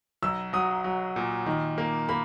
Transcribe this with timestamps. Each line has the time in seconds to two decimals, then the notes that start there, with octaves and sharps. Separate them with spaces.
0.22 B1 E6
0.53 F#3 D#6
0.84 F#3
1.16 A#2
1.46 D#3
1.78 A#3
2.09 A#3 B5